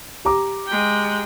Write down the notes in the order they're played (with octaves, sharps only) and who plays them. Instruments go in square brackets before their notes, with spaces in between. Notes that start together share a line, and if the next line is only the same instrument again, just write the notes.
[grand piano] G4 A#5 D6
[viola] G#3 G5